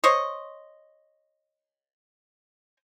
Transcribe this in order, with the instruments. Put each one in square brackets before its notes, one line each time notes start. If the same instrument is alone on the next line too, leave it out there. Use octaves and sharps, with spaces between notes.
[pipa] C5 C#5 D#5